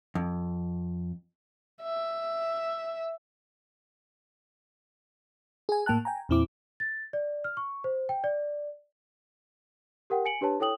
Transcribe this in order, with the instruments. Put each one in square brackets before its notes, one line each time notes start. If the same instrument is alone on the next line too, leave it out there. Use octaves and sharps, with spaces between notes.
[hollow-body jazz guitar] F2
[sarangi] E5
[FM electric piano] G#4 G#5
A2 A#3 G5 A5 F#6
G5 G#5 A#5
E2 A#2 C4 E4 D6
[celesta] A6
D5
F6
C#6
C5
G5
D5
G4 A#4 F#5 G5
G#5 C#7 D7 F#7
D4 G4 B4 C#5 A5
E4 A4 C#5 G5 D#6 F#7